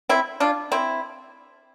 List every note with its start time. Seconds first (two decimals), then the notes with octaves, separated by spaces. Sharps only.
0.09 C4 E4
0.40 D4 F4
0.72 C4 E4